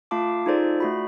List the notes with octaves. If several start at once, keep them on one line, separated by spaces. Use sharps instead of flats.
A3 F4 F5 A5 D6
D#4 F4 G#4 A4 C5 D5
A3 F#4 B5